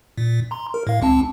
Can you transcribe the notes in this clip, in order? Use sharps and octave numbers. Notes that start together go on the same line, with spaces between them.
A#2
A#5 C6
A#4
A2 F5
C#2 C4 A5